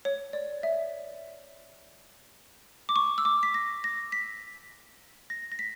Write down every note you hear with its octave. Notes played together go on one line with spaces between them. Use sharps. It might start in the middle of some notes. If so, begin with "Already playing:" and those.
C#5
D5
E5
D6
C#6
E6
D6
B6
A#6
A#6
B6
A#6
A#6
B6